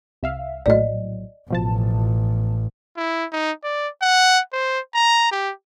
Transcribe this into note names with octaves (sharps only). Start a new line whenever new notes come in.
C2 E5 F5
A#1 A2 F#3 D5 D#5
A1 B2 F3 A5
E4
D#4
D5
F#5
C5
A#5
G4